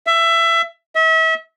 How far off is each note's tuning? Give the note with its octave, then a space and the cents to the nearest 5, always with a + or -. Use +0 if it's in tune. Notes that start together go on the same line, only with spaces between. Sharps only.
E5 +20
E5 -35